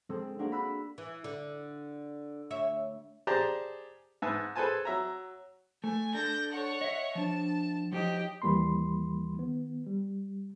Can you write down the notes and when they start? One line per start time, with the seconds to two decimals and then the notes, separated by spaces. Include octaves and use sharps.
0.09 G#3 C4 G#4 A4 E6
0.39 A#3 C4 D4 F#4 A#4 F#5
0.52 B5 E6 F#6
0.98 E3
1.24 D3
2.50 D2 C#5 E5
3.27 G4 G#4 C5 D5 A5 A#5
4.22 G#2 B4 E5 G#5 A5
4.55 G#4 A4 B4 C5 G#5 A5
4.85 F#3 E5 A#5
5.84 A3 G#5
6.15 D4 A4 G6 A#6
6.51 C#5 F#5
6.81 D#5 E5
7.15 F3 D4 A5
7.92 F3 F#3 D#4 G4 D#5
8.42 D#2 E3 G3 A#3 B5 C6
9.38 D#3 B3
9.86 G3